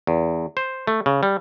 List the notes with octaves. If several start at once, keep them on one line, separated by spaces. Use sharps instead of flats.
E2
C5
A3
C#3
G3